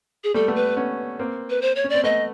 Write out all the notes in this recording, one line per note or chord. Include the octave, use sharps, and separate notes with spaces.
G#4
G3 A3 A4
A3 B3
B4
B3 C#4
A#3 C4
B4
C5
C#5
C#4
C4 D5
A3 B3 D#5